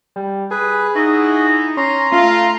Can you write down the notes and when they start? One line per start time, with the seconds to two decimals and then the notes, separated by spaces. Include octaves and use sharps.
0.16 G3
0.51 G#4 B4
0.95 D#4 E4 F#4
1.77 C#4 A#5 C6
2.12 A3 F4